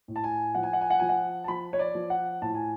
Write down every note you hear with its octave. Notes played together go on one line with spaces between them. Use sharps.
A2
A5
G#5
F3 F#5
G#5
F#5
G#5
F#5
F3 G#5
F#5
A5
F3 B5
C#5
D5
F3
F#5
A2 A5
G#5